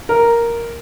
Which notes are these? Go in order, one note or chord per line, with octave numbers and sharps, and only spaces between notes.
A#4